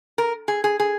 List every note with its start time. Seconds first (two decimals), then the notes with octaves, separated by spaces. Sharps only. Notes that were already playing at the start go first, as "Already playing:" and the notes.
0.18 A#4
0.48 G#4
0.64 G#4
0.80 G#4